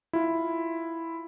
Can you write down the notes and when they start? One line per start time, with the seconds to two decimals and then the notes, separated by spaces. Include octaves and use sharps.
0.13 E4 F4